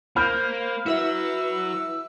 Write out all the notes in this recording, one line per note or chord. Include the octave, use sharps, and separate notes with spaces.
A#3 C5 B5 F6 G6
F#3 E4 F#4 B4 E5 E6